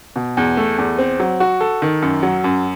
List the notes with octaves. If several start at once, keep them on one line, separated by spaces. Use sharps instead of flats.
B2
E2
A3
E2
C4
F#3
F#4
A4
D#3
F#2
F#3
F#2